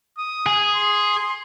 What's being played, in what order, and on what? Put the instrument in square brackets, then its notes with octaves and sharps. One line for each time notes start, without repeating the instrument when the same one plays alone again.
[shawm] D#6
[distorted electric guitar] G#4
[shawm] C6